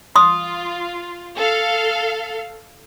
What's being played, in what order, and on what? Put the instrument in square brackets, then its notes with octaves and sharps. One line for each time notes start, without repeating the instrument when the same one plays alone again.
[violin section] F4 [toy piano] C6 D#6
[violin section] A4 F5